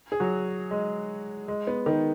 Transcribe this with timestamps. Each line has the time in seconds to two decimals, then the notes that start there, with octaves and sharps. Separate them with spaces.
0.12 G#4
0.20 F#3 F#4
0.71 G#3
1.48 G#3
1.67 B3
1.86 D#3 D#4